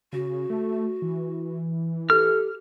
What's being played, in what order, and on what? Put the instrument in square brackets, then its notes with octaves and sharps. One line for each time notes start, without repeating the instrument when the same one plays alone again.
[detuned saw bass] C#3 [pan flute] F#4
[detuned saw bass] A3
E3
[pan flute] G4 [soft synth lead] A4 [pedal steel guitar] F6